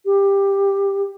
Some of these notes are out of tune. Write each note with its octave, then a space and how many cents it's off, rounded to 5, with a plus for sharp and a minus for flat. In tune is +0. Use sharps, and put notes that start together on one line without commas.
G4 +15